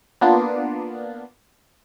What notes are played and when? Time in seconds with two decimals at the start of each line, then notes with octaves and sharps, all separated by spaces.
0.21 A#3 B3 D4 F4